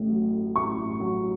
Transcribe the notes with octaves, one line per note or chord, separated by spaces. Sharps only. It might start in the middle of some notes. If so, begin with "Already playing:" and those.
Already playing: A1 A2
F#3
A3
A2 C#6
A1
F#3